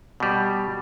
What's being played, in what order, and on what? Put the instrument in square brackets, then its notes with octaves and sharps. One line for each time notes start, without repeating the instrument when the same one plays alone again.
[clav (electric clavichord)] B2 G3